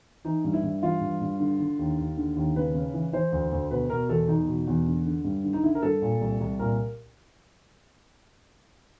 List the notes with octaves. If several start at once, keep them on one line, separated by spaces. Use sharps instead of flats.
E3 D#4
G2
E4
G2
E3 F4
G2
G2
D3
D3
D#2
D#2
D3
D#2
C#3 B4
C#3
E3
E3 C5
D2
D2
B2 B4
B2 A#4
E2 A4
E2 D#4
B2
E2
D3
D3
G2
D3
D#4
D3 E4
A#4
G2 A4
A#2
C2
C2
A#2 A#4